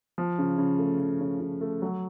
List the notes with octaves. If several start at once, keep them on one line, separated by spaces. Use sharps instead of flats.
F3
C#3
C#3
A3
F3
C#3
C#3
A3
F#3